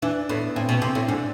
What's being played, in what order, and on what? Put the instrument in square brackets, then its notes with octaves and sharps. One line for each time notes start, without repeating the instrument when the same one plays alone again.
[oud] E3 [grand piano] D4
[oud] A2 [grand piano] B3
[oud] A2 [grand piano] C4
[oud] B2
[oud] C3 [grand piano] C4
[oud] A2
[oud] G#2 [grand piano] D4